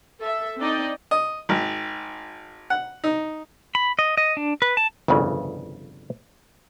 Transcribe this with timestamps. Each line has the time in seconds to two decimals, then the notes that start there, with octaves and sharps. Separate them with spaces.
0.21 A4 E5
0.58 C4 D4 D#4 D5 D#5 G5
1.11 D#5
1.49 G#1
2.70 F#5
3.04 D#4
3.75 B5
3.99 D#5
4.17 D#5
4.37 D4
4.62 B4
4.77 A5
5.08 G1 C2 F2 C#3 E3